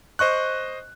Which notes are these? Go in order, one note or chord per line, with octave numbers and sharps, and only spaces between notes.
C5 D#5 C#6 F#6